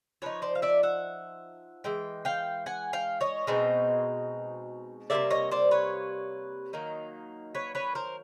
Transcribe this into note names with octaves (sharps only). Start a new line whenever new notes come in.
F3 A#3 D#4 B4 C#5
C5 D5
F5
D5 E5
E5 F#5
E3 G#3 G5
F5 G5
F#5 G#5
F5 G5
C#5 D#5
B2 G#3 C4 D#4
C3 E3 G3 A#3 D5 E5
C#5 D#5
C5 D5
B4 C#5
D#3 F#3 A#3 D#4
B4 C#5
B4 C#5
A#4 C5